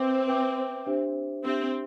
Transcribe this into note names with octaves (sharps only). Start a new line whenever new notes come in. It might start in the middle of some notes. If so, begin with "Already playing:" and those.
Already playing: C4 B4 E5 G5 D6
B4 E5 G5 D6
D4 G4 C5 E5
C4 D4 G4 C5 E5